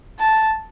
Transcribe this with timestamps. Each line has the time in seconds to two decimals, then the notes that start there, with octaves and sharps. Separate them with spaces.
0.19 A5